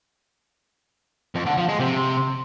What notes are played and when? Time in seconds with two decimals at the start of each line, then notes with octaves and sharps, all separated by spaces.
1.35 F2
1.46 D3
1.57 F3
1.68 G#3
1.80 C3